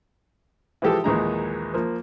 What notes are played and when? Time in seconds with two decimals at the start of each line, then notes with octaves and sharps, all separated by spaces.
0.82 E3 F3 G#3 G4 A4
1.04 A#1 D#2 E3 G#3 D#4 A#5
1.74 F3 A#3